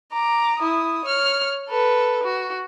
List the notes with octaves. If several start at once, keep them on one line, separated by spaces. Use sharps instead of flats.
A#5 D6
E4 D#6
C#5 F6
A4 B4
F#4